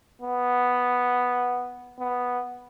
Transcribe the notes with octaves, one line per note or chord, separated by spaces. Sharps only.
B3
B3